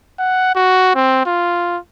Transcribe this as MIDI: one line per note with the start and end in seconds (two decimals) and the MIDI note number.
0.19 0.52 78
0.55 0.91 66
0.95 1.21 60
1.26 1.78 65